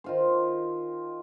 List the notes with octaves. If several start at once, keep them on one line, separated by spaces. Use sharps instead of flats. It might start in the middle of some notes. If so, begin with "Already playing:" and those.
D#3 F4 C5